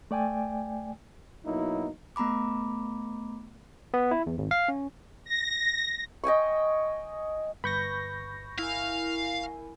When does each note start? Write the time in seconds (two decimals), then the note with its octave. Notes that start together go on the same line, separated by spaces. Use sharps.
0.11 A3 D5 G5 G#5
1.46 B2 F#3 A#3 D#4 E4
2.16 A3 B3 A#5 B5 D6
3.94 B3
4.11 E4
4.26 E2
4.38 G#1
4.51 F5
4.68 C#4
5.24 A#6
6.24 D#5 G5 G#5 C#6
7.64 G1 B4 B5 C#6 G6 A#6
8.59 E4 A#4 F5 G#5